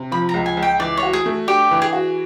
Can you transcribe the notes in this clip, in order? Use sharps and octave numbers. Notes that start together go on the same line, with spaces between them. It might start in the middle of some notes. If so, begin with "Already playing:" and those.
Already playing: C3
F3 B5
A#5
C#2
G#5
C#2
G5
E3 D5
C#5
F#4
G#4
A3
D4 G4
E3
G#4
F#4